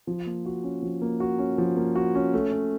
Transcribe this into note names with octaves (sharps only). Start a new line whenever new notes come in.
F3
A#3
F#4
C#4
F3
A#3
F#4
C#4
F3
A#3
F#4
C#4
A3
C#4